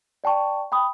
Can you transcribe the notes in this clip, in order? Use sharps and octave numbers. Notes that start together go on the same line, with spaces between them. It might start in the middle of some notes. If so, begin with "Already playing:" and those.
D5 G5 A5 C#6
G5 B5 D#6